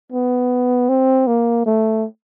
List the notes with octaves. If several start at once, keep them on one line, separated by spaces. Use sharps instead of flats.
B3
C4
A#3
A3